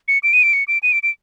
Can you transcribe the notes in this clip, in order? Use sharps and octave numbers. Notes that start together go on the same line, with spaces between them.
C#7
D7
D#7
D7
C#7
D7
D#7
D7
D7